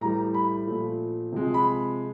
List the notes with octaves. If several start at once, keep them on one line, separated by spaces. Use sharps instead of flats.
A2 E3 G3 A#5
B5
A#2 F3 A3
C3 F3 G#3
B5